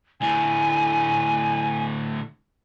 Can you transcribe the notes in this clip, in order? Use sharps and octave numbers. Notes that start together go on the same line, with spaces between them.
D2 A2 G#5